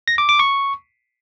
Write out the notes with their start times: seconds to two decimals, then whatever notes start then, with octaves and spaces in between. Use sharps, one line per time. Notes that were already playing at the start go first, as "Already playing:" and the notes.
0.08 A#6
0.18 D6
0.29 D6
0.39 C#6